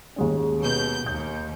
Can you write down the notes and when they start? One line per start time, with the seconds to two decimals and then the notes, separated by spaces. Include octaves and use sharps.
0.16 D#2 G#3 C#4
0.60 B2 G6
1.06 D#2 G6